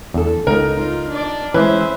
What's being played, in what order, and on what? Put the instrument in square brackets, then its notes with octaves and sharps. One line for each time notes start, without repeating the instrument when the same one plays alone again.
[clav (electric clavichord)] E2 [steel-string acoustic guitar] D4 A4
[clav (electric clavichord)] C#2 [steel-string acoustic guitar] B3 D#4 [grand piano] A#4
[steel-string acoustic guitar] D#4 [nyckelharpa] F4
[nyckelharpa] D4 D5
[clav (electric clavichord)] E3 [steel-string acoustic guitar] G#3 C#4 [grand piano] B4 [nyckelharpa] C5 E5